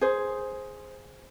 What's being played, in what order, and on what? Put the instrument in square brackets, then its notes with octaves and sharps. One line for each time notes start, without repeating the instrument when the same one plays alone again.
[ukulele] G#4 C5